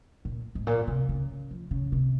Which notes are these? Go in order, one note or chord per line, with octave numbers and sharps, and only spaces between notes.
A#2
G#2
A#2
C3
C#3
F3
C#3
C3